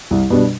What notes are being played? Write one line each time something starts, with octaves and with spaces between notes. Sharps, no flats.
C2
B2 G3 D4